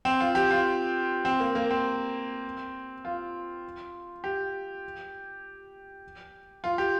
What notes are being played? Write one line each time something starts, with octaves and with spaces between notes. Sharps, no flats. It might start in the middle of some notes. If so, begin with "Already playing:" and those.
C4
F4
G4
F4
C4
A#3
A#3
C4
F4
G4
F4
G4